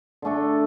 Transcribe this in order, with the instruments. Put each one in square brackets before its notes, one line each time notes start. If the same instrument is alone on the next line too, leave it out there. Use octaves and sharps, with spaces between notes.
[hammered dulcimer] D3 A3 D4 A4